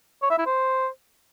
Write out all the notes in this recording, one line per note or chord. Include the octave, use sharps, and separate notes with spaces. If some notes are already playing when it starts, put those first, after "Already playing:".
C#5
E5
E4
C5